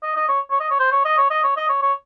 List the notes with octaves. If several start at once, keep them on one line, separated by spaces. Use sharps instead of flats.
D#5
D#5
C#5
C#5
D#5
C#5
C5
C#5
D#5
C#5
D#5
C#5
D#5
C#5
C#5